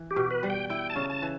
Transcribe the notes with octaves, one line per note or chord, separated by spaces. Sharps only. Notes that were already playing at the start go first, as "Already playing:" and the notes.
Already playing: E3
G4
B2
B4
G3
G5
E4 G5
A5
C#3
A5
E3